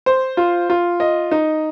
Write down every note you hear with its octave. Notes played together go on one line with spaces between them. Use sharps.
C5
F4
F4
D#5
D#4